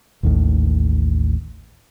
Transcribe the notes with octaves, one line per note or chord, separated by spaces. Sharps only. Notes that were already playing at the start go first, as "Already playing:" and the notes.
A1 D#2 A2